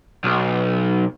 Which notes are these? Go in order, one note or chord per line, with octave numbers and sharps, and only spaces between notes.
B1